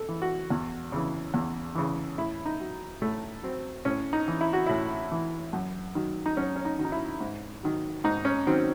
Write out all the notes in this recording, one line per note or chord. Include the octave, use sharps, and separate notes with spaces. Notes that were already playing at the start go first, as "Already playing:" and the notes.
Already playing: A4
E3
F#4
E2
C#3 E3
E2
C#3 E3
A2 E4
D#4
F#3
A2 A3
F#3 C4
A2 C#4
D#4
E3
E4
F#4
A2 E4
E3
F#2
D#3 F#3
D#4
F#2 C#4
C#4
D#4
D#3 F#3
D#4
E4
G#2
D#3 F#3
G#2 D#4
C#4
D#3 F#3 C4